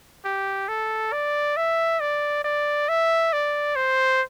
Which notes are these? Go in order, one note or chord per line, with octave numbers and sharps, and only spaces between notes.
G4
A4
D5
E5
D5
D5
E5
D5
C5